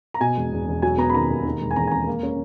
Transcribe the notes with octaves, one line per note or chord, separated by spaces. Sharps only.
A#5
B2 G#5
E1
E2
E1
F#3 G#5
B3 A#5
B5
D#3 A#5
D#2
D#3
E1
G#5
E2 A#5
G#5
E1 A#5
A#3
C#4